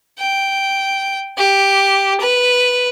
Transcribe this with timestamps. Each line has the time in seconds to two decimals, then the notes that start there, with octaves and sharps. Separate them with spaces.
0.19 G5
1.38 G4
2.21 B4